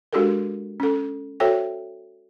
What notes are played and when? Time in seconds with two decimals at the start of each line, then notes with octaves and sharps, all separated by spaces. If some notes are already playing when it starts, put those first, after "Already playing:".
0.13 G#3 D4 F#4 G4 A4 A#4
0.80 C#4 A4
1.40 F#4 A4 C5 C#5 E5 G5